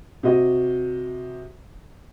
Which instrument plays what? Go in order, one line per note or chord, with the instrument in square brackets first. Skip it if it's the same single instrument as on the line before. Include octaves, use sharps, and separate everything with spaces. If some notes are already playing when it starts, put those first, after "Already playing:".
[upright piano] C3 F#4 D#5